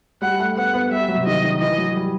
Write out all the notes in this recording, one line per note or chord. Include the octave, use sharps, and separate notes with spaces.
G3 F#5
A3
B3 F#5
B3
G3 E5
F#3
C3
D#3 D#5
D#3
E3 D#5
F#3
G3